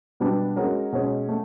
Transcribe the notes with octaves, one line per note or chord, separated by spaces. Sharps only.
B2 G3 B3 D4
G#3 C#4 F#4 A#4
B2 G#3 C#4
A3